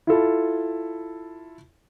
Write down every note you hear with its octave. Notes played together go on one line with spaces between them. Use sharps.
E4 F4 A4